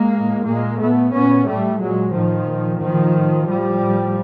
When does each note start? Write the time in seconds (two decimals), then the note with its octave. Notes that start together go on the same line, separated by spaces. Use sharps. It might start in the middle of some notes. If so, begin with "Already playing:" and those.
Already playing: G#3 A#3
0.13 A2
0.45 A#2 G#3 A#3
0.79 A#2 A3 B3
1.12 A#2 B3 C#4
1.45 A2 G3 A3
1.79 A#2 F#3 G#3
2.12 A2 D#3 F3
2.46 A#2
2.79 A#2 D#3 F3
3.13 A2
3.46 A2 F3 G3
3.79 A2